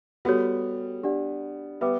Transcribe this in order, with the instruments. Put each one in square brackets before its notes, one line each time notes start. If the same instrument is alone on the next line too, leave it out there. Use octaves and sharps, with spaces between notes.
[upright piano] G3 B3 [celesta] F#4 A4 C#5
[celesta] D4 G4 D5 F#5
[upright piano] G3 B3 [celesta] B4 E5 G5 D6